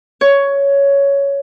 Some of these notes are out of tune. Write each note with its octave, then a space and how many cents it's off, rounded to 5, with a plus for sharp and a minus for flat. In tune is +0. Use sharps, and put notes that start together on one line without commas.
C#5 +10